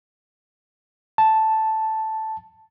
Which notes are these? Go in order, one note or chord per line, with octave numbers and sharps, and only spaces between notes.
A5